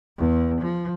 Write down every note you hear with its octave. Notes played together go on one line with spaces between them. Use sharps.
E2
F3